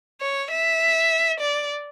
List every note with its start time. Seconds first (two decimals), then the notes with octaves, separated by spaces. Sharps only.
0.21 C#5
0.51 E5
1.40 D5